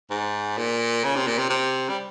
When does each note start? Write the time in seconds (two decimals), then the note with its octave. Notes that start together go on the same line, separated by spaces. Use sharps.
0.10 G#2
0.58 A#2
1.04 C#3
1.16 C3
1.27 A#2
1.38 C3
1.50 C3
1.89 G3